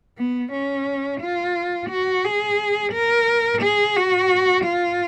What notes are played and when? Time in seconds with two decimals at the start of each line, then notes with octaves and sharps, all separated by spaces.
0.18 B3
0.53 C#4
1.22 F4
1.90 F#4
2.24 G#4
2.93 A#4
3.62 G#4
3.97 F#4
4.65 F4